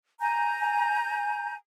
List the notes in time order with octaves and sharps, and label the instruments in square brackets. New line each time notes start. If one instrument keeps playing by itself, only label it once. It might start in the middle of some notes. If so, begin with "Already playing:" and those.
[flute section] G#5 A#5 G6